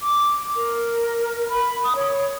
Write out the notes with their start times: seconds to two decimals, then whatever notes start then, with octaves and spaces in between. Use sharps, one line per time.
0.01 D6
0.56 A#4
1.49 B5
1.84 D#6
1.96 C#5